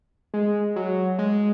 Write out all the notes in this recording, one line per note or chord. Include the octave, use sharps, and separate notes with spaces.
G#3
F#3
G#3